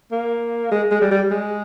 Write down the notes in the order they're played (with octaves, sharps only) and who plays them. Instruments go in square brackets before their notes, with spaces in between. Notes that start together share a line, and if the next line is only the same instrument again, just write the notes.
[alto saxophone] A#3
G#3
G#3
G3
G3
G#3